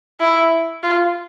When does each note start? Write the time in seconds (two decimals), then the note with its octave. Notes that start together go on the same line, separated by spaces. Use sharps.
0.21 E4
0.83 F4